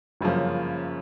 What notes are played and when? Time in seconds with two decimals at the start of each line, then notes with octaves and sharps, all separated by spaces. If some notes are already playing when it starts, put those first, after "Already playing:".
0.21 G1 F#2 C#3 F3 A#3